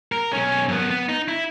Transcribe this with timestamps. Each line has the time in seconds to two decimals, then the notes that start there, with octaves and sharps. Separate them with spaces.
0.12 A#4
0.32 B1 C#4
0.68 F#2 B3
0.90 B3
1.09 D#4
1.28 E4